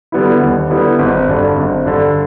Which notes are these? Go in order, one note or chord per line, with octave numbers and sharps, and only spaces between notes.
D3 G3 B3 E4
D#2
D3 G3 B3 E4
G#1
G2 D3
G#1
G2 D3